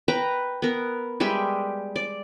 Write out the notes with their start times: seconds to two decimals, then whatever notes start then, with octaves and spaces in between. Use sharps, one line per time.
0.08 B4 G5 A#5
0.62 B3 A#4
1.20 G3 G#3 G4 E5
1.96 D5